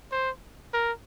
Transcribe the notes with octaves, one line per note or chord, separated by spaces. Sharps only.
C5
A#4